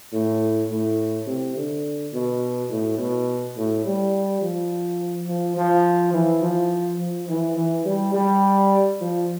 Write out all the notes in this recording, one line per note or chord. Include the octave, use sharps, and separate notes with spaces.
A2
A2
C3
D3
B2
A2
B2
A2
G3
F3
F3
F3
E3
F3
F3
E3
E3
G3
G3
F3